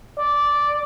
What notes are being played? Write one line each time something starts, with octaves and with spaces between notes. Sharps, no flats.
D5